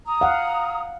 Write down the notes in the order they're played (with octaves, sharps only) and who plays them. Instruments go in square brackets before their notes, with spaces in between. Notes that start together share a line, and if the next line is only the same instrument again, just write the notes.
[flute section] A#5 D#6
[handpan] F5 F#5